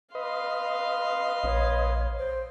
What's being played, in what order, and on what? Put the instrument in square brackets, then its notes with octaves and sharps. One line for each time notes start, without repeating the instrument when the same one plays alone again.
[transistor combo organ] B4 D#5 [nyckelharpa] F5 C6
[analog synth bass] A#1 [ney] C#5
[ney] C5